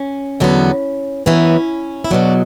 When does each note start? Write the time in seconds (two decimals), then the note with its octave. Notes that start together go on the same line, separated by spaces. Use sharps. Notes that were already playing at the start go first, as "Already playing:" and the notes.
Already playing: C#4
0.40 E2 D3 F#3 B3
1.26 F#2 E3 B3 C#4
2.04 E4
2.11 E2 B2 F#3 D4